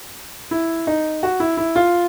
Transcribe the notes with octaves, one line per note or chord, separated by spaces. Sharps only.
E4
D#4
F#4
E4
E4
F4